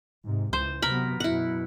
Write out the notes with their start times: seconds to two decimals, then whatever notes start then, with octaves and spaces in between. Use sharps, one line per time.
0.24 G#2 C3
0.53 C#2 E3 C5
0.82 C3 F#3 B3 A#4 B5
1.20 F#2 B2 E4 F#5